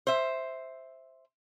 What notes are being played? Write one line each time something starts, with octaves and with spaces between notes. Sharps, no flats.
C5 E5